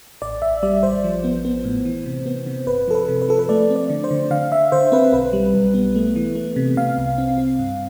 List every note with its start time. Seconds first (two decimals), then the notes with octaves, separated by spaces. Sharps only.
0.22 A1 D5
0.42 A1 E5
0.63 G3 D5
0.83 A1 C5
1.04 F3
1.24 B3
1.45 B3
1.65 A2
1.85 E3
2.06 C3
2.26 B3
2.46 C3
2.67 G1 B4
2.88 F3 A4
2.95 B4
3.08 C3
3.22 B4
3.28 F3 A4
3.39 B4
3.49 A3 D5
3.70 C4
3.76 D5
3.90 D3
4.04 C5
4.11 D3
4.31 D3 F5
4.52 D3 E5
4.72 D3 C5
4.92 C4 B4
5.12 B1 B4
5.33 G3
5.54 B1
5.74 B3
5.95 A3
6.16 E3
6.35 A3
6.56 C3
6.77 C3 F5
6.97 C2
7.18 C4
7.38 C4
7.59 G2